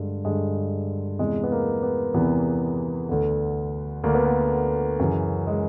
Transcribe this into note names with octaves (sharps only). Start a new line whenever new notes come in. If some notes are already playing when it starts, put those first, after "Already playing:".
Already playing: G2 D3 G#3
G2 D3 G#3
E2 C3 E3 G#3
B3
A#3
B3
E2 C3 E3 B3
D2 D3
D2 D3 A#3
B3
A#3
F#2 C#3 E3
G#3